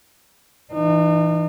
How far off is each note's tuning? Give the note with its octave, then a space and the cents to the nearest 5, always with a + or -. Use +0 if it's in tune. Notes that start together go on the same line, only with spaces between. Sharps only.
E3 +0 D#4 -40